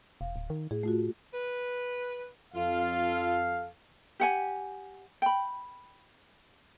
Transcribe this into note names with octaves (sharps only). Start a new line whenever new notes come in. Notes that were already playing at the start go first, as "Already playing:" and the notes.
E1 F5
D1
D#3
A2 G#4
A3 F4 F#4
B4
F2 F4 A4 F5
G4 F#5 G#5
G5 B5